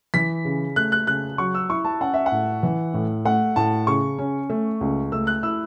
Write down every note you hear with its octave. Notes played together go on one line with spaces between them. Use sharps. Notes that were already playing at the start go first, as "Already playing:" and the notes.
E3 B6
C#3
A3 F#6
F#6
C#3 F#6
F#3 C#6
E6
E4 C#6
A5
C#4 F#5
E5
F#5
A2
E3
A2
A3 F#5
A2 A5
C#3 C#6
C#4
A3
C#2
A3 E6
F#6
E4 E6